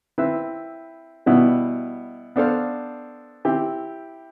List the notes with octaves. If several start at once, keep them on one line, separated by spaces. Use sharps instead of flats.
C4 E4 B4 E5
B2 G3 B3 E4
B3 D4 A4 C5 F5
C4 E4 G4